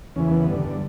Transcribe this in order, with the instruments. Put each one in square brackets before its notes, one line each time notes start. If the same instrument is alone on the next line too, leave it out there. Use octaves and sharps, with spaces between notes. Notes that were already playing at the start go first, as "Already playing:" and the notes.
[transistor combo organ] E2 C#3 E3 C#4
B3
G2 D3